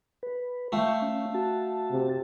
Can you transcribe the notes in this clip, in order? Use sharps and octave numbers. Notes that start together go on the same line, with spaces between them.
B4
A3 F4 G5 C#6
C#4
F#4 A5
C3